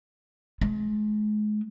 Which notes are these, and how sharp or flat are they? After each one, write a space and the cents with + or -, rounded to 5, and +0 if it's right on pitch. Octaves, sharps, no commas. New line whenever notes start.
G#3 +35